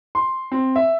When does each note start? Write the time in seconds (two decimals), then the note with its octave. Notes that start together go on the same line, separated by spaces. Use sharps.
0.15 C6
0.52 C4
0.76 E5